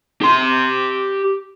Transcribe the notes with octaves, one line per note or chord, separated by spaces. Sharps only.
G4 C6